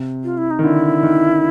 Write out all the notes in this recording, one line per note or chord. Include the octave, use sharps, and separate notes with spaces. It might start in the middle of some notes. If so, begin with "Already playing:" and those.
Already playing: C3
F4
E4
D#4
D#3
D3 E4
D#3